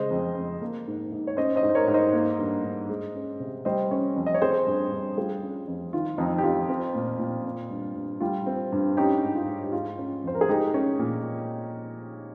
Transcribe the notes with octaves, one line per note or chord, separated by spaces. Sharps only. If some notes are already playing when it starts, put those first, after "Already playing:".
Already playing: C#3 G#3 C5 D#5
F2
F2
A#3
G#2
G#2
C#5
C#4 C5 D#5
C5 D#5
G#2
C5
A#4 C#5
G#2
C5 D#5
A#3
G2
G2
G#3
C#4
C3
G3 C5 D#5
C#4
F2
D#5
C#5
C4 G#4 C5
G2
G2
G3 F4 G#4
C#4
F2
D#3 F4
F2 D#4
G4
F2 F4
C4
A#2
A#2
C4
G2
G2
G3 F4
C4
G2
C#4 D#4 G4
G#2
F4
G#2
G4
G#3 F4
C#4
F2 C5
A#4
G#4
G#3 D#4 G4
C#4
A#2